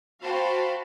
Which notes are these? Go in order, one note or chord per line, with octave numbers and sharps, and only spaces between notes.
F#4 C5 F5 G5 A5 B5